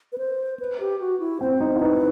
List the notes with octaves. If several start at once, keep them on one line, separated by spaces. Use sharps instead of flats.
B4
C5
B4
G4
F#4
E4
C4 C5
D#4
E4
D#4 B4